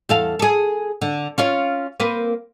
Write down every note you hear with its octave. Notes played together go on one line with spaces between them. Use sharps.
E2 A4 F5
G#4 A4
D3
C#4 F4 C#5
A#3 C4 B4